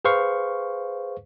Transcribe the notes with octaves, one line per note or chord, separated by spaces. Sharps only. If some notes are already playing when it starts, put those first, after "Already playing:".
G#4 B4 C5 F5 C#6